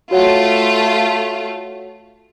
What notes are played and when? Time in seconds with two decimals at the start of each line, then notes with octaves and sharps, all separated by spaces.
0.11 A3 F4 F#4 C#5 F#5